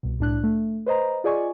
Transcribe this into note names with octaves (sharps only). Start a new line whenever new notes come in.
C2 B2
C2 A2 D4 F#6
A3
B4 C5 D#5 A#5
F4 G#4 D5 D#5 G#5 C#6